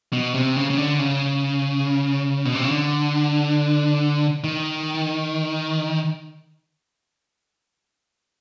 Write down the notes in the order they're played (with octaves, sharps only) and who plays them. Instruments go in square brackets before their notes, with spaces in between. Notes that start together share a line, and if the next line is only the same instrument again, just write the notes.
[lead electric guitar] B2
C3
C#3
C#3
D3
C#3
B2
C3
C#3
D3
D#3